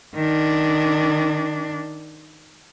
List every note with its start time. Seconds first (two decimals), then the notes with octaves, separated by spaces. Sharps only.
0.15 D#3 D4